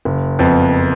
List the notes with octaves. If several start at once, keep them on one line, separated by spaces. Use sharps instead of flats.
F#1
F2 F3 B3